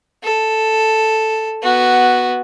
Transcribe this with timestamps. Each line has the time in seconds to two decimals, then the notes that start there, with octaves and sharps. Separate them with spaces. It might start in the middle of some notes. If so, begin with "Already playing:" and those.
0.24 A4
1.63 B3 F#4